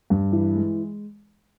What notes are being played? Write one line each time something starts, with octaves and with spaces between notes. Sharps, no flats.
G2
E3
G#3